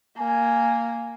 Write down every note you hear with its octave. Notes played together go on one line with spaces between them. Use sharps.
A#3 G#5